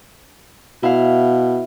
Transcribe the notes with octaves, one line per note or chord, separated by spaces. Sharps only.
B2 E4 F5